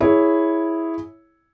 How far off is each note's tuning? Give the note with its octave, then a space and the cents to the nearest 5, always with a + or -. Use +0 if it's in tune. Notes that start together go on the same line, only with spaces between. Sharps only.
E4 -5 G#4 +0 C#5 +0